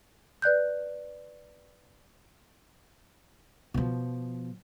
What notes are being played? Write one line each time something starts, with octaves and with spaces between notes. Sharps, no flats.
B4 D5 F#6 G6
B2 F3